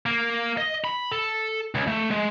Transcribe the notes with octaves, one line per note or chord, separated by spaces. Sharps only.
A#3
D#5
B5
A4
C#2
A3
G#3